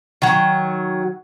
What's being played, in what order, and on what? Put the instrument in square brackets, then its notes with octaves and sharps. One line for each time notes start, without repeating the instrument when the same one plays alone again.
[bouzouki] D#3 F#3